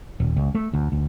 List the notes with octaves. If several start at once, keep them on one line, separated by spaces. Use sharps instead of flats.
D#1
C#2
A3
D2
D2